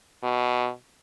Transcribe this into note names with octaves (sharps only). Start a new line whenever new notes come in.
B2